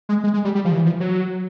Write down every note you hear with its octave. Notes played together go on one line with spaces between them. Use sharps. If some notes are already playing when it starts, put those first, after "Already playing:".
G#3
G#3
G#3
G3
G3
F3
D#3
E3
F3
F#3